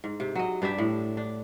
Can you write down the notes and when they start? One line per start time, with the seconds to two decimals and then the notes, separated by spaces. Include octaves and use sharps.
0.04 G#2
0.20 C3
0.35 F#3 D#5
0.62 G2 D4 G4 E5
0.78 A2
1.17 D4